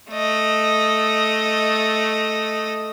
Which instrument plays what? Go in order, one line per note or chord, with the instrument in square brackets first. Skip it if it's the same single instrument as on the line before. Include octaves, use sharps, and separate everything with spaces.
[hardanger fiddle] A3 D#5